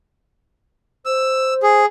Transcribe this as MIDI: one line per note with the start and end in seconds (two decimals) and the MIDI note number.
1.06 1.82 72
1.06 1.54 88
1.63 1.86 68